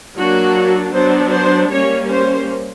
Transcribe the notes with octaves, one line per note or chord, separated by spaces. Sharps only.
F#3 A#3 D4 F#4
F#3 B3 D4 C5
C5
G3 A#3 C#4 C#5
C5